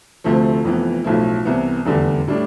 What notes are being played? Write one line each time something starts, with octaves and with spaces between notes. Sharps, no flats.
D2 C3 F3 A3
F1 F2 E3 B3
B1 A2 F3 A3 E4
C2 C3 E3 B3
F1 E2 D3 G3
A2 G3 D4